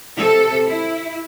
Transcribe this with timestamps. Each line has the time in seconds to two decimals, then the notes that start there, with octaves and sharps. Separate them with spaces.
0.18 C3 A4
0.65 E4